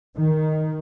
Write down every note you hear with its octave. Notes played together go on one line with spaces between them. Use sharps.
D#3